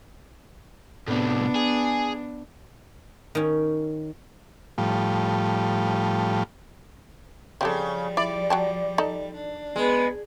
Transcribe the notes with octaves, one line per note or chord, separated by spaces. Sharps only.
A2 C3 B3 D4
G#4
D#3 C#4
A2 F3 G3
C#3 F3 G3 C4 G4 A4
E4 D5
F#3 G5 A5
D#4 A4
D4
G#3 B3